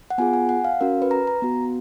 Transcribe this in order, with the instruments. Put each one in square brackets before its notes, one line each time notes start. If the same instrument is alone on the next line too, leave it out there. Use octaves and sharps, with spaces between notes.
[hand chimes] F#5
B3 F4 G#4 G#5
G#5
F#5
F5
C#4 F#4 A#4
B4
A#5
A#5
B3 F#4